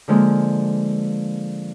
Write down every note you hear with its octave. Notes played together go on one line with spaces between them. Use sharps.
D3 F3 G#3 A#3